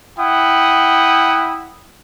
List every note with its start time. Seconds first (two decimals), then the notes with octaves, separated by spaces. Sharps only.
0.18 E4 F#5 G5 D#6